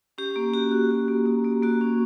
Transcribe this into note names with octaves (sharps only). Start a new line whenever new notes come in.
C#4 G4
A#3
F#4 G4
F#4
F#4
A#3
A#3
A#3
A#3 F#4
C#4